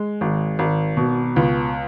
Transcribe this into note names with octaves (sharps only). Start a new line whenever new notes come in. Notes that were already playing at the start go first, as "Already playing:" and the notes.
Already playing: G#3
G#1
G#1
B2
C#2